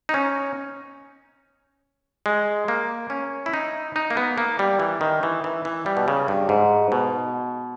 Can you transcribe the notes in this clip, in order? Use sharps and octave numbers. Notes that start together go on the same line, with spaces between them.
D#4
C#4
G#3
A#3
C#4
E4
D#4
D#4
A#3
B3
A#3
G3
E3
D#3
E3
E3
E3
G3
B2
C#3
G2
G#2
B2